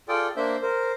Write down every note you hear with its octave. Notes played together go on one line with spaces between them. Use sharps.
F4 G#4 A4 D5 G5
A#3 D4 C5 E5 G6
A#4 C5